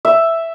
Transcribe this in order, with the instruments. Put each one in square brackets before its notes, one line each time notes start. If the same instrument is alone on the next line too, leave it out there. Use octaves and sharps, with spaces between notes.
[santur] E5